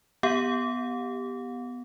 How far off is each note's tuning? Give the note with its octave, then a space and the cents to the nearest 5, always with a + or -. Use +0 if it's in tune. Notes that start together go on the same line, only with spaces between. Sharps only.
B3 +0 G4 +0 F5 +45